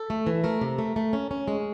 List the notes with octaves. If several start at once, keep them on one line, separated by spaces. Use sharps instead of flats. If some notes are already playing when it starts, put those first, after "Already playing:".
Already playing: A4
A3
E3
A3 A#4
C3
A3
A3
C#4
C#4
G#3